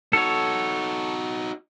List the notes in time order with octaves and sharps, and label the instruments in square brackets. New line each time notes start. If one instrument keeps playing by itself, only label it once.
[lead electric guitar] D#4 F#4 [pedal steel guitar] A4 C#5